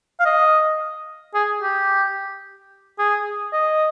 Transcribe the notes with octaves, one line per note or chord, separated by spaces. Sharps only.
F5
D#5
G#4
G4
G#4
D#5